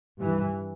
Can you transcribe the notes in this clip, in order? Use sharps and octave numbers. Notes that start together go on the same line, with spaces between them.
G2 E3